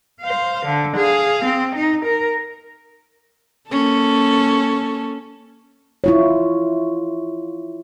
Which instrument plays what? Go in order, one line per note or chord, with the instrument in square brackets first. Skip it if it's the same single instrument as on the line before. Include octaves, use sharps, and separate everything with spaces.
[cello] C5 F5
D3
G#4 F5
C4
D#4
A#4
[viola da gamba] A#3 C#4 A4
[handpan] E4 F4 C#5